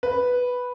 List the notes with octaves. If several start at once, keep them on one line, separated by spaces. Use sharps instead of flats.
B4